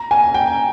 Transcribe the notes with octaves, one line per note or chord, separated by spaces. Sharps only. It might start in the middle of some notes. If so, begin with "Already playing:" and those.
Already playing: A#5
G#5
G5